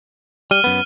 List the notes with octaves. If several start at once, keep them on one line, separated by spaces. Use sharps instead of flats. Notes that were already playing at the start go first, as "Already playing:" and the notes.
G3 F6 D#7 G7
F#2 B3